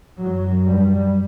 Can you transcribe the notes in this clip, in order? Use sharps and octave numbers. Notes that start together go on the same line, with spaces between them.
F#2 F#3
G3